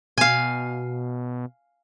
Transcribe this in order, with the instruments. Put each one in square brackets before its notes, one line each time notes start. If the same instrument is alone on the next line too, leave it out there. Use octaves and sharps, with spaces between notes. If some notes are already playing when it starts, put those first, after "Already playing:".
[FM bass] B2 [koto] F5 G#5